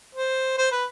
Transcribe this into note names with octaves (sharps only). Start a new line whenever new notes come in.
C5
C5
B4